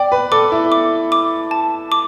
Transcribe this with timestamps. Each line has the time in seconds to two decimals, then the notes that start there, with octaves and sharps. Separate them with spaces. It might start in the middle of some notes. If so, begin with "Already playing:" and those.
Already playing: D5 G5
0.12 B4
0.32 A4 D6
0.52 E4
0.72 D6
1.12 D6
1.51 A5
1.92 D6